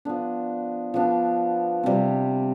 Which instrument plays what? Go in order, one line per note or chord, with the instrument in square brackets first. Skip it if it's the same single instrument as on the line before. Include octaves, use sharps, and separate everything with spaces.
[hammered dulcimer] F3 B3 D4
F3 B3 D4
C3 G3 C4